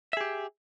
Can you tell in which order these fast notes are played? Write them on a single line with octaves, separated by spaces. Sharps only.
E5 G#4 G4